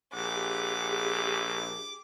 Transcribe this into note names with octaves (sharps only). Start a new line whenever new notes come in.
A#1 G4 G#4 F#5 D6